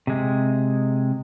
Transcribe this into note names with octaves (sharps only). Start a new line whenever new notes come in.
C3 G#3